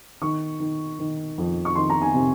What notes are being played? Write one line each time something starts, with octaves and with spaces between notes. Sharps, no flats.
D#3 C#6
D#3
D#3
F2
C#6
D#3 C6
A#5
G#5
C3